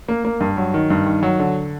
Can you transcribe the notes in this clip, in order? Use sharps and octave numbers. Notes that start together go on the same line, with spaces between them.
A#3
A#3
G2
F#3
D#3
G2
D#3
F#3
D3